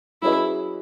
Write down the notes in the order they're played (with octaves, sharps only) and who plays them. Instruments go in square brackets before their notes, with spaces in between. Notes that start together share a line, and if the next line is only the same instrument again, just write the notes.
[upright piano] F#3 C#4 G#4 B4 D#5 [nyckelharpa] E4